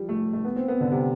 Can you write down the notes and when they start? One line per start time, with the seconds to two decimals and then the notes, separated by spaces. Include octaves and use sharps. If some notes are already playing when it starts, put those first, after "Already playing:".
Already playing: F3 G3
0.09 A3
0.33 A3
0.45 B3
0.56 C4
0.68 B3
0.81 D3
0.91 C3